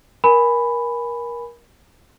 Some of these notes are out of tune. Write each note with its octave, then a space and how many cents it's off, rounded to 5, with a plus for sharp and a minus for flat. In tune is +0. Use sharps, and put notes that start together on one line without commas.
A#4 +25 G#5 +0 B5 +5